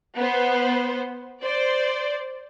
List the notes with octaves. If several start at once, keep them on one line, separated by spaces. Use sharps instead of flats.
B3 C5
C5 D5